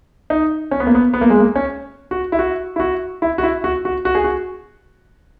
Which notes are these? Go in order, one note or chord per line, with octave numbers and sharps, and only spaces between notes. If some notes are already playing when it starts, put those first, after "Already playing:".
D#4
C#4
B3
A#3
B3
B3
A#3
G#3
A#3
C#4
F#4
E4
F#4
E4
F#4
E4
F#4
E4
F#4
F#4
F#4
G#4
F#4